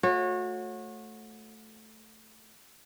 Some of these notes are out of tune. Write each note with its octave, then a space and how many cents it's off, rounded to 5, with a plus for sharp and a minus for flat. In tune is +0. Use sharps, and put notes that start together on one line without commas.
A3 +0 F#4 -30 C#5 -25